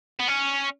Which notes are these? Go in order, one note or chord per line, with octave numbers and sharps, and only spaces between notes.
B3
C#4